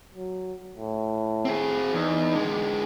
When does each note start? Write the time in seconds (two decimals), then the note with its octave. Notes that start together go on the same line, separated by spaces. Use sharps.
0.15 F#3
0.77 A2
1.45 C4 G#4
1.93 E2 D#4
2.33 D3 G#3